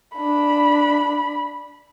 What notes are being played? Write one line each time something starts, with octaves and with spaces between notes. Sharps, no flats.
D4 B5